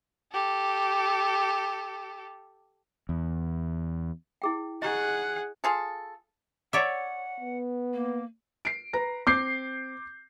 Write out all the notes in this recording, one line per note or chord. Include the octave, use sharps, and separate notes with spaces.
G4 A4
E2
E4 G#4 G5
G#4 D#5 F#5 A#5 C#6
F4 G#4 A4
C#5 D5 E5 F#5
B3
A#3
C7 D7
B4 A#5 A#6
C4 D6 G6 C7